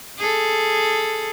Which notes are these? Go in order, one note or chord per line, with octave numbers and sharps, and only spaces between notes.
G#4 A4